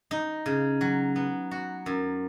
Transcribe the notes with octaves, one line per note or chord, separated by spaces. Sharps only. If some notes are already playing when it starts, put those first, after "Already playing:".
D#4
C#3
F#3
B3
F#4
F#2